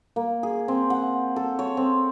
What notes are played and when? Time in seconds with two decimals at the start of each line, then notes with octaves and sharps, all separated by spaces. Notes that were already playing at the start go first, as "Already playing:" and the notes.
0.16 A#3
0.43 G#4
0.68 C4
0.90 F#5
1.36 A4
1.59 C#5
1.77 C4